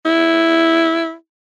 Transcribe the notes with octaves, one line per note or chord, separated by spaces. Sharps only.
E4